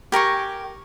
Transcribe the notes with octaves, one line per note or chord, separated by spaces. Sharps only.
G4 A#4 G#5 C#6